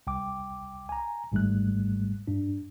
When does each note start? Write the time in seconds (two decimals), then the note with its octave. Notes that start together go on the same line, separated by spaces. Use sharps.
0.07 C2 G5 D6
0.89 G#5 A#5
1.32 G#1 G#2 G3 A3 F#6
2.27 G2 D4